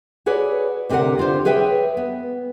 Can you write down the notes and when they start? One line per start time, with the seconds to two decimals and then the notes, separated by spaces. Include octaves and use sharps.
0.26 F#4 G#4 B4 C#5 D5
0.89 D2 C3 D4 G#4 A#4 F#5
1.18 D3 F4 G4 C5
1.45 G#4 B4 C#5 E5 G5
1.97 B3